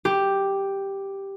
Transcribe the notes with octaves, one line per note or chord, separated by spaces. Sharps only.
G4